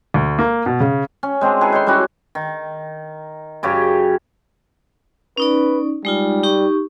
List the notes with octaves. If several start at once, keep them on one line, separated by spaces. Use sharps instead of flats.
D2
A#3
B2
C#3
C#4
G#3 C4 D4 G#4
E4 G#4 A4 B4
D#4 C#5 C6
G3 C#4 E4 F#4
D#3
F#2 C#3 G4 C#5
C#4 D#4 B4 D5
G3 G#3 D#4 F4
D#4 G4 C#6